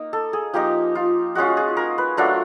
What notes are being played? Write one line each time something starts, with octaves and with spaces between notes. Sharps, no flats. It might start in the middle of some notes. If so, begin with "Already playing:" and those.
Already playing: A#3 D#4
A4
G#4
F3 A#3 D#4 G4
F4
G#3 C#4 F4 F#4
G#4
A#4
B4
F#3 A3 D4 F4 A#4